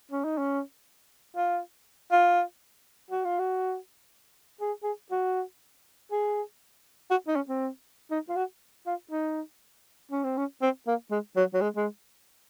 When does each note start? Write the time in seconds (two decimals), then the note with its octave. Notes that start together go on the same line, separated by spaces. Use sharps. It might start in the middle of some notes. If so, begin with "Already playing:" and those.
0.11 C#4
0.24 D#4
0.38 C#4
1.36 F4
2.11 F4
3.11 F#4
3.24 F4
3.39 F#4
4.61 G#4
4.83 G#4
5.11 F#4
6.11 G#4
7.11 F#4
7.28 D#4
7.36 C#4
7.49 C4
8.11 D#4
8.29 F4
8.36 F#4
8.86 F4
9.11 D#4
10.11 C#4
10.24 C4
10.37 C#4
10.62 C4
10.87 A#3
11.11 G#3
11.36 F#3
11.54 F#3
11.61 G#3
11.76 G#3